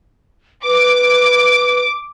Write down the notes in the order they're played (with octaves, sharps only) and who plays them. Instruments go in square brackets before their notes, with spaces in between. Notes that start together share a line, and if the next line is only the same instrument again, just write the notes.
[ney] B4 [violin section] D6